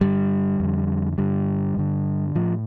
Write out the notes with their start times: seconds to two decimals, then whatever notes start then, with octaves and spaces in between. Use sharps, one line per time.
0.01 G2 D3 G3
0.60 F2 D3
1.18 G2 D3 G3
1.77 G2 D3
2.35 A2 F3